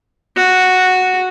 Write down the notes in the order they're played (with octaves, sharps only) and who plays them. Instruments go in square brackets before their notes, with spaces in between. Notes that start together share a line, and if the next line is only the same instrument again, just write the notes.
[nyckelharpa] F#4